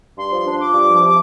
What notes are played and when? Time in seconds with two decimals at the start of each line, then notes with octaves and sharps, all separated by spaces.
0.18 G2 C6
0.32 F3
0.47 D4
0.60 F4 D6
0.74 G2
0.88 F3
1.02 C3